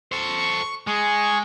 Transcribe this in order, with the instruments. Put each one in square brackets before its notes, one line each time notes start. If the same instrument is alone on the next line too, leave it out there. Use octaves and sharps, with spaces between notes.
[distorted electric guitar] A4 C5 [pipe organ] C#6
[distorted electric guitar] G#3 [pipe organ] G#4 C#6